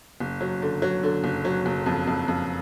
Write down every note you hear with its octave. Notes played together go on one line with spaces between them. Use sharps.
F#1
F#3
D3
F#3
D3
F#1
F#3
F#1
F2
F2
F2